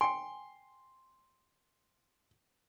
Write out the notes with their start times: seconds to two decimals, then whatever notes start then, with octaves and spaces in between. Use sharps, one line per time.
0.01 G5 G#5 C6